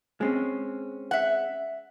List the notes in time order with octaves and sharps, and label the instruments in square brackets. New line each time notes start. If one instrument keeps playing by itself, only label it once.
[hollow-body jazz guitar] G#3 C4 C#4
[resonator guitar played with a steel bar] E5 F#5